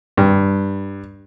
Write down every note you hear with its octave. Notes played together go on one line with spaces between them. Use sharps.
G2